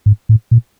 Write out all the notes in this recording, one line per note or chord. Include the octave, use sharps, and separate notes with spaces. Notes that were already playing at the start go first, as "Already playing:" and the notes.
G#2
A2
A#2